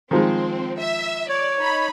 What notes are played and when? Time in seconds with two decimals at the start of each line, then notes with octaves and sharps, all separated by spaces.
0.11 D#3 F3 G#3 C4
0.79 E5
1.29 C#5 D5
1.59 D#4 B5